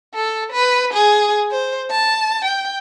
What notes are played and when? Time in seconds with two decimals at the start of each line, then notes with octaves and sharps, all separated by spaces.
0.14 A4
0.52 B4
0.93 G#4
1.51 C5
1.91 A5
2.45 G5